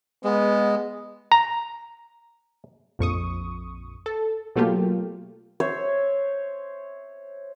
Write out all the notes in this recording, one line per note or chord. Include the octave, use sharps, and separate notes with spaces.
G#3 B3
A#5
A#1 F2 C#6 D#6
A4
B2 F#3 A3 A#3 F4 G4
C5 C#5 E5